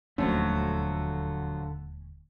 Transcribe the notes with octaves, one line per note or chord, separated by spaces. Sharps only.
D#1 D2 D3 F3 F#3 A3 C#4